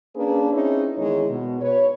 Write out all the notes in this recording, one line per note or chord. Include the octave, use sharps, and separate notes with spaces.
A#3 C#4 D4 G#4 B4
C4 C#4 D#4 E4 G#4 C#5
E2 D#3 G#3 D#4 E4 C#5
B2
B4 C#5